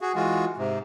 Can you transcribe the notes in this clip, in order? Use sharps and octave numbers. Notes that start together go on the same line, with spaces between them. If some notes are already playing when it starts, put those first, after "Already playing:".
F#4 G#4
E3 G#3 F4 F#4
G#2 C3